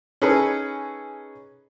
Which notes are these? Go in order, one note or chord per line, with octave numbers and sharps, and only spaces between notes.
C#4 D#4 G#4 A4 B4